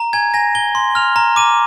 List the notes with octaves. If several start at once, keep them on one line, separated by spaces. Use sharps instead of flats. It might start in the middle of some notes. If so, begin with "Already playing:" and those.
Already playing: A#5
G#5 G#6
G#5 A#6
G#5 G7
C6
F6 F7
A#5
D6 D#7